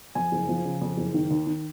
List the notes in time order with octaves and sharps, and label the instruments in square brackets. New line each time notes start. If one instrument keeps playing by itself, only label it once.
[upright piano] F2 G#5
F#1
F3
C#3
F2
F#1
D#3
D#2
D#3